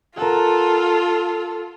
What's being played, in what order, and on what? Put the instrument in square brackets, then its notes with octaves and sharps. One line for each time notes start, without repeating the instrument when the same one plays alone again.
[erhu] F4 [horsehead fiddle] A4 [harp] A#4 F#5